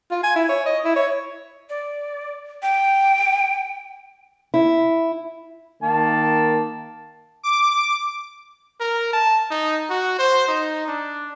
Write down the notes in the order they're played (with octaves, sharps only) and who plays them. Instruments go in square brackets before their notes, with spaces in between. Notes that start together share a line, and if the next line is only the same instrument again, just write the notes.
[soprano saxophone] F4
G#5
E4
C#5
D#5
E4
C#5
[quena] D5
G5
[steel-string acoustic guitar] E4
[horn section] D#3 A#3 A5
[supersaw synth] D6
[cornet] A#4
A5
D#4
F#4
C5
D#4
D4